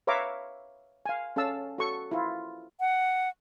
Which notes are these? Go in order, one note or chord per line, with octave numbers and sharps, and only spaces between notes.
B4 C#5 E5 F5 A#5 D6
F5 G#5
C#4 A4 F5 A5 E6
F#4 A4 C#6
E4 F4
F#5